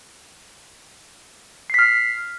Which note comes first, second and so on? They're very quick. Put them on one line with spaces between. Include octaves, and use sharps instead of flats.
C7 B6 F6